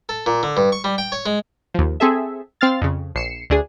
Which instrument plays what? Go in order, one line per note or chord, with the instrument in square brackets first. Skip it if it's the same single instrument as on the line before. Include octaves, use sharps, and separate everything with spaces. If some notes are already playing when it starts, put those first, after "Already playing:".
[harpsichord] A4
A#2
D3
G2
C#6
G3
G5
C#5
G#3
[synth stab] D#2 F3
C4 G#4 A4 E5
C4 F5 F6 A6
F2 C#3
A#1 C7 C#7 E7
D2 D4 G#4